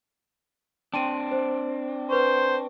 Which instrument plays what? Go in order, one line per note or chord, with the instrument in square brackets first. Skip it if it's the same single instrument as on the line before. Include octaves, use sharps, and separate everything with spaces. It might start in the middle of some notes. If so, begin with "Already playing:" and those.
[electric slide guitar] C4 D4 [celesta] G5 C6 D#7
[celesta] C5
[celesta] B4 C#6 [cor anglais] C5